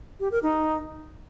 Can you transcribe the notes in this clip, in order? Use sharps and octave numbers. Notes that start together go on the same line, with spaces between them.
G4
A#4
D#4